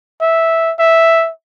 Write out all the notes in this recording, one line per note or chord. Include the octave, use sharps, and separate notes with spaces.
E5
E5